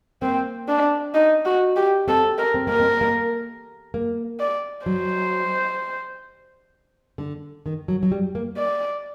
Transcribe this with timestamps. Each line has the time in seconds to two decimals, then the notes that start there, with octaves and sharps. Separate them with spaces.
0.22 A#3 C4
0.68 D4
1.14 D#4
1.45 F#4
1.76 G4
2.08 C4 A4
2.38 A#4
2.54 C4
2.67 A#3 A#4
2.80 C4
3.01 A#3
3.94 A#3
4.40 D5
4.86 F#3 C5
7.18 D3
7.66 D#3
7.88 F#3
8.03 F#3
8.12 G3
8.35 A#3
8.58 D5